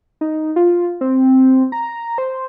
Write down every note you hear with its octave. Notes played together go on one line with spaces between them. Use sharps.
D#4
F4
C4
A#5
C5